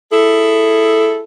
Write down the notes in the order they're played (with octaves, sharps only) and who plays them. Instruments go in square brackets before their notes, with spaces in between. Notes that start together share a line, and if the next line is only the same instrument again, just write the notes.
[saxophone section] E4 G#4 A4